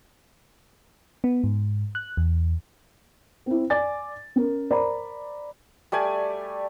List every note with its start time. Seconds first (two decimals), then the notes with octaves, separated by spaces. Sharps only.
1.24 B3
1.44 G#2
1.95 F#6
2.17 E2
3.46 C4 E4
3.70 D5 G#5 D6 A6
4.36 C#4 A#4
4.70 A#4 C5 D5 A#5 B5
5.92 G3 A3 D5 G#5